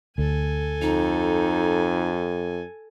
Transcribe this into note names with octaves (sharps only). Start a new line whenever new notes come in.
D2 A4 G#5
F2 D#4